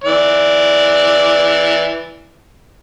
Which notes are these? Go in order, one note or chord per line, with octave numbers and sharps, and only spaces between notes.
E3 D5